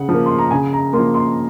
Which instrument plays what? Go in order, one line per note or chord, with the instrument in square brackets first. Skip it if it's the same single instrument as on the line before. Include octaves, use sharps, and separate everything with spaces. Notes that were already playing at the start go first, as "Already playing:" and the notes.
Already playing: [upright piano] C#3 F#5
F3 A#3
C6
A#5
C#3 G#5
A#5
A#3 C6
F3
C6